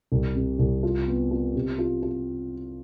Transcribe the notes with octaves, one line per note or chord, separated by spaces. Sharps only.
C2
C3
C2
F4
B3
F4
C3
F4
F4